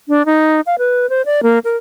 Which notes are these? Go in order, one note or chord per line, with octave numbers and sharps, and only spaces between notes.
D4
D#4
F5
B4
C5
D5
A#3
A#4